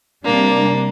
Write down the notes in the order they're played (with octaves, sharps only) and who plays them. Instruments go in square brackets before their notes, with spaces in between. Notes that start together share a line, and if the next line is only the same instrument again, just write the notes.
[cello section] C3 G3 D4 [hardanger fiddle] A#3